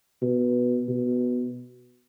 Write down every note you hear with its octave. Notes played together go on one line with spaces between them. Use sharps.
B2
B2